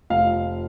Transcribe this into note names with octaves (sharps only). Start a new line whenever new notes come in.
F1 F5